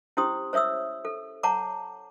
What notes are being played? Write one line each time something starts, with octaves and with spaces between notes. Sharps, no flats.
C#4 E4 G4 C5 C6 D#6
C5 C#5 E5 D#6 E6
A4
C#5 F#5 A5 A#5 D6